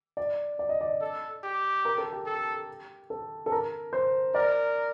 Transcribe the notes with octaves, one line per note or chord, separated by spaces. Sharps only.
D5
D5
D#5
D5
A4
G4
A#4
A4
G4
A4
A4
A4
A#4
C5
A#4 D5